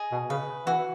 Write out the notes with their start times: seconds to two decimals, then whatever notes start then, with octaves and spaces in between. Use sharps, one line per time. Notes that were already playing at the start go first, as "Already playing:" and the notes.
Already playing: G#4 D#5
0.12 B2
0.30 C#3 B4
0.67 E3 F#4